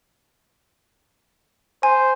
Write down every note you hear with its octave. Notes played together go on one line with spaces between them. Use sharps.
C5 G#5